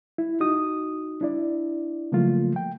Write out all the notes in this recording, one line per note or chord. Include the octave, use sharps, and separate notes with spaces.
E4
D#4 F#4 D#6
D4 E4 D5
C#3 F3 F#3 A3 A#3 F4
G5